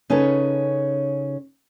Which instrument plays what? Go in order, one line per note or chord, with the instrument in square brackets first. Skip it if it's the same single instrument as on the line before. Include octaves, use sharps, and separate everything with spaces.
[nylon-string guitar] C#3 C#4 D#4 A4 B4 C#5